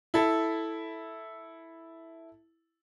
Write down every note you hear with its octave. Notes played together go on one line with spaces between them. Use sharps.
E4 A4